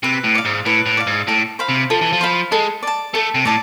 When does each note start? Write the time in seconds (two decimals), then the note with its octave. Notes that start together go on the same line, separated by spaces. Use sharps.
0.03 C3 B4
0.24 A2
0.35 D5 F5
0.45 G#2
0.66 A2 B4
0.86 A2
0.97 D5 F5
1.07 G#2
1.27 A2 A4
1.59 C5 F5 B5
1.69 C3
1.90 F3 A4
2.01 E3
2.12 F3
2.21 C5 F5 B5
2.52 G#3 A4
2.83 D5 A5
3.14 A3 A4
3.34 C3
3.45 A2 D5 A5